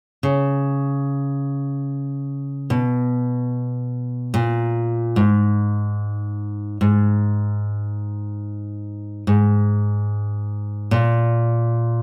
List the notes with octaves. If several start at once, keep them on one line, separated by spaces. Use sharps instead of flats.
C#3
B2
A#2
G#2
G#2
G#2
A#2